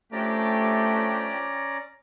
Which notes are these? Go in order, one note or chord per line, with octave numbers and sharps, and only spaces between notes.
F3 A3 C#4 D4 G4 D5 A#5